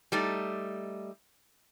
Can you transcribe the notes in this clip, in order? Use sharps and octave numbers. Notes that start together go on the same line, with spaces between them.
G3 A3 D#4